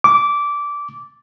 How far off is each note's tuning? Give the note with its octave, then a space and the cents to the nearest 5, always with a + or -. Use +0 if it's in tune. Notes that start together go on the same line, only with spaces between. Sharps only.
D6 -15